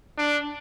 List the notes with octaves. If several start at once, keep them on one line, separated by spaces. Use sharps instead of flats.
D4